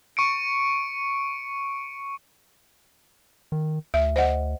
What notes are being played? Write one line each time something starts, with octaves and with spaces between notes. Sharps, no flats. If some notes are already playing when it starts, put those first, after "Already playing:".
C#6 C#7 D7
D#3
D2 E5
C5 D#5 F#5